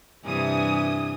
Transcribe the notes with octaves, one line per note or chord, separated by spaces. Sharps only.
G2 C3 E3 G#5 D#6